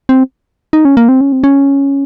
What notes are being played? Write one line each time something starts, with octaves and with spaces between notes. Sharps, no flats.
C4
D#4
C#4
A#3
C4
C#4
C4
C#4